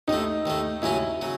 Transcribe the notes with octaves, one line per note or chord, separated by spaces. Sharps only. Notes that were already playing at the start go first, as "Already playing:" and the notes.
D#2 D#3 A3 D#4
D#2 D#3 A3
D#2 C#3 F#3 C#4 E4
C#3 F#3